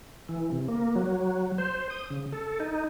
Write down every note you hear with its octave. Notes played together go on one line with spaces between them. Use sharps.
E3
C3
A#3
F#3
C5
D#6
C#3
A4
D#4